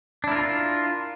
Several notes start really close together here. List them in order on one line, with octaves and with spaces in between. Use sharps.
D4 E4 A#4 F4